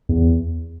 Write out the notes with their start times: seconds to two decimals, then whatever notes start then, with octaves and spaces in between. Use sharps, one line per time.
0.09 E2